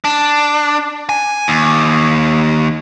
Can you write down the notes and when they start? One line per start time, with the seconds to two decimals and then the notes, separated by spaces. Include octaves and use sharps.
0.05 D4
1.09 G#5
1.48 D#2